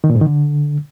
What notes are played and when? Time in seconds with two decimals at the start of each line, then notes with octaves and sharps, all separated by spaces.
0.04 D#3
0.09 A#2
0.15 G#2
0.21 D#3
0.27 D3